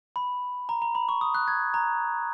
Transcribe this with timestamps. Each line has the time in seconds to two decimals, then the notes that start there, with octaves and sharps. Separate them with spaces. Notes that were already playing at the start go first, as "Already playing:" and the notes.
0.16 B5
0.69 A#5
0.82 A#5
0.95 B5
1.09 C#6
1.21 D#6
1.35 F#6
1.48 G#6
1.74 A#5